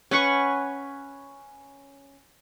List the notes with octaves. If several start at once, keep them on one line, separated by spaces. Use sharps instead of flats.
C#4 B4 F#5 C#6